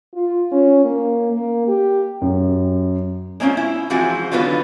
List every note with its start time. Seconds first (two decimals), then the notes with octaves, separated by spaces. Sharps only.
0.14 F4
0.52 C#4
0.84 A#3
1.33 A#3
1.68 G4
2.21 F#2
3.40 G#3 A#3 C4 C#4 F4
3.57 E4
3.90 E3 F3 G#3 C4 F4 F#4
4.32 D3 D#3 F#3 B3 F4 B4